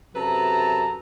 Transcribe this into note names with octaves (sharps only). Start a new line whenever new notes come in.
F#2 C3 A4 B4 A5 A#5